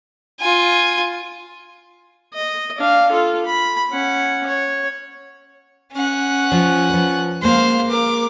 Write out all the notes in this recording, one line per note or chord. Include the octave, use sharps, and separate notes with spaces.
F4 G#5
D#5
D4 F5
F4 A4
B5
C#4 F#5
C#5
C#4 F#5
F3
F3 B4
G#3 A#3 C5 F5
A#4 D6